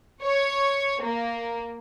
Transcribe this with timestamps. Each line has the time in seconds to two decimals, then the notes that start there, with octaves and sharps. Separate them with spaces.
0.23 C#5
1.01 A#3